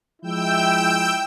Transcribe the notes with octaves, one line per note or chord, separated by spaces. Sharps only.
F3 G#3 E4 G5 E6 G6